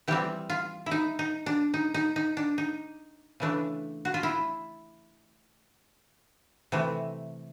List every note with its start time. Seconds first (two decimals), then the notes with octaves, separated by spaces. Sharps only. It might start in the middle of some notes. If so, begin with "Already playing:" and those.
0.08 E3 G3 C4 G4
0.50 F4
0.86 E4
0.91 D#4
1.19 D#4
1.46 D4
1.74 D#4
1.94 D#4
2.16 D#4
2.37 D4
2.58 D#4
3.40 C#3 E3 A3 D4
4.05 F#4
4.14 F4
4.23 E4
6.72 C3 E3 A3